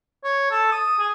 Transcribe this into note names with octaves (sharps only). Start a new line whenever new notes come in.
C#5
A4
D#6
G#4